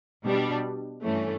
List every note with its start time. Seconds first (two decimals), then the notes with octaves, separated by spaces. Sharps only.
0.25 B2 G3 D4
1.02 G2 E3 A3 C#4